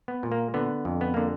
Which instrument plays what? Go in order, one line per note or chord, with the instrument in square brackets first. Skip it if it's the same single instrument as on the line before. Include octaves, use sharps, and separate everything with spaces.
[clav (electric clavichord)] B3
A#2
A#3
D3 B3
F2
B3
D3 A#3